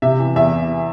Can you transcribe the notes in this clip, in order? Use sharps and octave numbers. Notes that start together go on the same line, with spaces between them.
C3 E5
E3
E2 E5